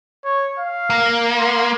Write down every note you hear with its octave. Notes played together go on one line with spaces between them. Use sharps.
C#5
F5
A#3
C6